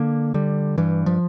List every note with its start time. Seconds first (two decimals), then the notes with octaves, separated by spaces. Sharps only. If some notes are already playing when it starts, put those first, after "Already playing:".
Already playing: D3 A#3
0.34 D3 G3
0.78 G2 E3
1.06 F3